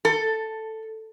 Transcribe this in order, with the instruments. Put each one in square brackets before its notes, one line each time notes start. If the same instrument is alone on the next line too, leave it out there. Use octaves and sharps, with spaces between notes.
[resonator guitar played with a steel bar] A4